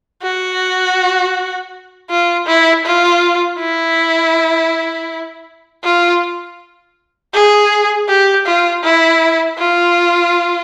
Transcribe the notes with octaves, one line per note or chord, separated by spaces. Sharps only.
F#4
F4
E4
F4
E4
F4
G#4
G4
F4
E4
F4